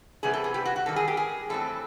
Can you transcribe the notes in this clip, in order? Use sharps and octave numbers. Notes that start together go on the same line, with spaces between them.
C3 E3 G3 B3 E4 G#4
A4
G#4
G4
F#4
F#4
G#2 D#3 G3 A4
G#4
G4
G#4
A2 E3 G3 C4 A4